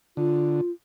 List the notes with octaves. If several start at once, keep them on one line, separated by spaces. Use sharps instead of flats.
D3 F4